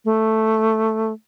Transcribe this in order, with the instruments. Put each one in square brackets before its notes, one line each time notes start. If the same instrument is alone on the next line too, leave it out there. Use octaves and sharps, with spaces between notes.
[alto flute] A3